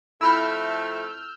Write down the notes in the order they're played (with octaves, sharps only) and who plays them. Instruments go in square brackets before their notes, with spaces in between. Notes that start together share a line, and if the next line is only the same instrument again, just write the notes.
[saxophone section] F2 A3 [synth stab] E4 B5 [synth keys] E6 F6 G6